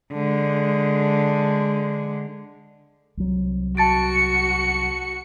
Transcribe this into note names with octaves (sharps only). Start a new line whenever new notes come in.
D3 G#3
C2 F#3
F#4 A5 A6 C#7 D7